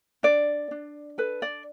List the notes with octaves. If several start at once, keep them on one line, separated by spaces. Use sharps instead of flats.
D4 D5
D4
A4 B4
D5